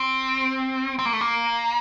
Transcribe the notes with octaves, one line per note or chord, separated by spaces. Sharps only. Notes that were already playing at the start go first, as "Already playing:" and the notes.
Already playing: C4
C4
A#3
A3
A#3